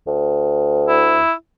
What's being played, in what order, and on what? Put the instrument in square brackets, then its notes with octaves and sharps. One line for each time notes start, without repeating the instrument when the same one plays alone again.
[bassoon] D2
[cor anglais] E4